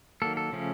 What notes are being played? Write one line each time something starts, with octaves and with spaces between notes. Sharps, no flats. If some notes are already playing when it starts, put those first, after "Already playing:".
D#3 F#3 A#3 A4
A4
C#3 F3 A3 C#4